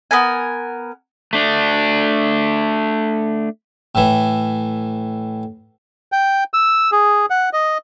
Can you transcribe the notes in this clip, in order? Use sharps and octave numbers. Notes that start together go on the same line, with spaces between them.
B3 A#4 G#5
A3 D4
A2 E3
G5
E6
G#4
F#5
D#5